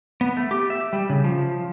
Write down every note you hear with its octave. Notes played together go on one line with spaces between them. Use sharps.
B3
A3
G4
E5
G3
C#3
F3